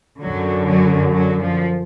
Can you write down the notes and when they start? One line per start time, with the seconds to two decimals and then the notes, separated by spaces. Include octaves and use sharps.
0.21 F#2 D3 F#3
0.67 F#3
1.13 F#3
1.42 F3